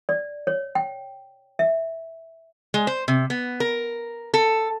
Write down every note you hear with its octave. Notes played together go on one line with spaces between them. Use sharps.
D5
C#5
G5
E5
G#3
C5
C3
B3
A#4
A4